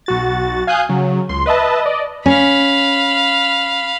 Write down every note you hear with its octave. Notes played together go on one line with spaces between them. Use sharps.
B1 F#4 A6
F5 G#5 D#6 F#6 G6
C#3 F#3
C#2 C6
B4 D#5 E5 A5
D5 D#5
C#4 F5 B5